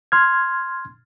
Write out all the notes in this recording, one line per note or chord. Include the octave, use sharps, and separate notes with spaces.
C6 F6 G#6